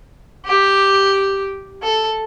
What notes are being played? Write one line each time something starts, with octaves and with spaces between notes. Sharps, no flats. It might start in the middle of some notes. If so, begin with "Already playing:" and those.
G4
A4